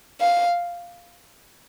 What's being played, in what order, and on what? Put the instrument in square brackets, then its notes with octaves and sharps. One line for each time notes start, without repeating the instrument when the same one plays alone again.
[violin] F5